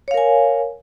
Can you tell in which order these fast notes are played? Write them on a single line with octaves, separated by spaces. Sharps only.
C#5 F5 A#4 G#5